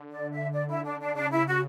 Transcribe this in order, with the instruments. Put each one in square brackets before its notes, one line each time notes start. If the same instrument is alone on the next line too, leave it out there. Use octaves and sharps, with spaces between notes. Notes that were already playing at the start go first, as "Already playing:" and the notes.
Already playing: [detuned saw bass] D3
[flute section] D5
E5
D5
E4
D4
D4
[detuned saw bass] C#3 [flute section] D4
[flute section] E4
F#4